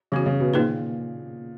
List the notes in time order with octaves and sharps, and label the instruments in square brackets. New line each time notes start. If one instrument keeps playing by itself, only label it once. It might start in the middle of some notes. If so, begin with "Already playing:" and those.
[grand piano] C#3 [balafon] E3 B3 F#4
[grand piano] C#3
B2
[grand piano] A#2 [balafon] D#3 A#3 D#4 G#4 B4